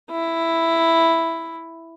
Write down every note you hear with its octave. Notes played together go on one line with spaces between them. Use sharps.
E4